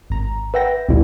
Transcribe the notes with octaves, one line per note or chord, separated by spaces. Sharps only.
G#1 A#5
B4 E5 F#5 G5 A#6
A1 D2 B2 G3 E4